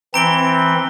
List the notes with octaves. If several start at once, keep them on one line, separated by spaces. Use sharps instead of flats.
E3 C4 A#5 D7 G7